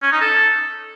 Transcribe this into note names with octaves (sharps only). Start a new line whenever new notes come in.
C#4
D#4
A4